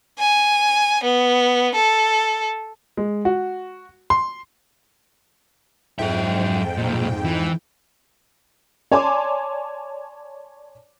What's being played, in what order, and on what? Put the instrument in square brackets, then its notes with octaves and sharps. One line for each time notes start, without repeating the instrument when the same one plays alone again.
[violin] G#5
B3
A4
[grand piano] G#3
F#4
C6
[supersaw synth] F2 G#2 G5 [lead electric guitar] F#3 E5
[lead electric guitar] B1 A#2
E3
[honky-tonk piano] C#5 D5 G#5 A5 C6 D6